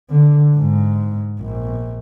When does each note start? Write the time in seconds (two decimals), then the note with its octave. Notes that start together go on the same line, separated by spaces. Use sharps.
0.10 D3
0.56 G#2
1.40 A#1